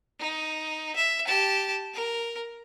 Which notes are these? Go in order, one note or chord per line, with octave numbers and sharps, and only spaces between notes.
D#4
E5
G4 A5
A#4